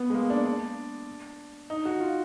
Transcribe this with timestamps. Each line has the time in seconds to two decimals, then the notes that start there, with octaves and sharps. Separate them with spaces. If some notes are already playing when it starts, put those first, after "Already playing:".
Already playing: B3
0.10 G#3
0.14 A#3
0.30 D4
0.45 D4
1.70 D#4
1.85 F#4
2.00 F4